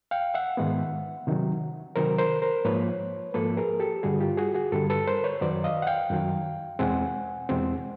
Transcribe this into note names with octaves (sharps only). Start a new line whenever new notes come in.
F5 G5
E5 F#5
G#2 D#3 G#3 B3
C3 D#3 F#3
C3 D#3 F#3 A#4 C5
A#4 C5
A#4 C5
G#2 F3 A#3 B4 C#5
G#2 F3 A#3 A4 B4
G#4 A#4
G4 A4
G2 D3 G3 F#4 G#4
F4 G4
F#4 G#4
F#4 G#4
G2 D3 G3 G4 A4
A4 B4
A#4 C5
B4 C#5
F#2 D#3 F#3 C5 D5
D#5 F5
F#5
F5 G5
F#2 D#3 F#3
E2 B2 G#3 C4 F#5 G#5
E2 B2 G#3 C4